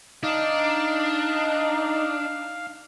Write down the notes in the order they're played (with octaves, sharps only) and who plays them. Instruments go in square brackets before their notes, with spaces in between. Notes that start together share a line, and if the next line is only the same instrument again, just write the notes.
[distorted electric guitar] D4 [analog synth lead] D#4 [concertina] F5